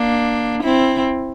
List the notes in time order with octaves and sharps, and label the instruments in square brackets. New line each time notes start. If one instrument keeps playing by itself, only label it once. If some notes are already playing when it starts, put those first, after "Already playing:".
Already playing: [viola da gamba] A#3 D4
C4 E4